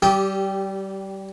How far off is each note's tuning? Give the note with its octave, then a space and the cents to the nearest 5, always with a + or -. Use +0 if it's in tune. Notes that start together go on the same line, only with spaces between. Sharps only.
G3 -25 G4 +0 D#6 +40